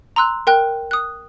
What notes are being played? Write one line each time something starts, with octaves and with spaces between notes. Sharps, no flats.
A#5 C6 E6 F#6
A#4 G5 F#6
D#6 F#6